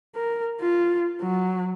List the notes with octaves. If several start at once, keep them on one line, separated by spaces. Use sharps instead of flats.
A#4
F4
F#3